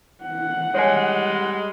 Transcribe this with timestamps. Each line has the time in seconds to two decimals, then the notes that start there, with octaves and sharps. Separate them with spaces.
0.24 F#5
0.74 G3 G#3 C#5 G#5